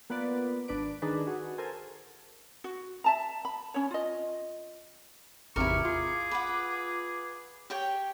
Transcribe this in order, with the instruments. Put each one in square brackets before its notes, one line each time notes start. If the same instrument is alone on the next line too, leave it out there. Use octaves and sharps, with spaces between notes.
[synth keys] A#3 B3 F4 B4 D5
G#1 D4 B4 D7
D#3 D4 D#4 G#4 B4
F#4 G#4
A4 A#4 C5 G#5
[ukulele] F#4
E5 A5 A#5
B5
C#4 C#5
F4 D#5
[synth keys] G#1 E2 C3 [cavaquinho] E4 A#4 [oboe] C#6 [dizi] D6
[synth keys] F4 [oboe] G#4
[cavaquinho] B4 F#5
G4 C#5 G5